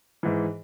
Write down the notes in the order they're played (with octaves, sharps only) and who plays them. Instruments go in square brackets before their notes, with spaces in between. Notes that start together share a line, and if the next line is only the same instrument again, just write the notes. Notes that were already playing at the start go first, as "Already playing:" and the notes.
[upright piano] G#2 E3